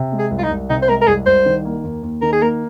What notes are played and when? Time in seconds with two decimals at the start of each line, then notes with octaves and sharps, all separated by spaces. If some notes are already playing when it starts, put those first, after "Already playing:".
Already playing: C3
0.12 G#3
0.19 G#4
0.31 C2
0.39 F4
0.43 D#4
0.50 C2
0.69 C3 D#4
0.82 C5
0.88 G#3 A#4
1.01 A#4
1.08 C2 G#4
1.26 C2 C5
1.46 D#3
1.65 A#3
1.84 D#2
2.03 D#2
2.22 D#3 A#4
2.33 G#4
2.41 A#3 A#4